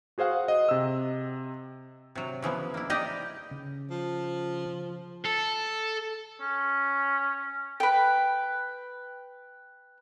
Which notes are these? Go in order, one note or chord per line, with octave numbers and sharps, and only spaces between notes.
F#4 G#4 C5 F5 F#5
D#5
C3 E6
C3 F#3
C#3 E3 F3 B3
A#3 E4
A#3 D#4 G4 D5 D#5
C#3
F3
A4
C#4
B4 G5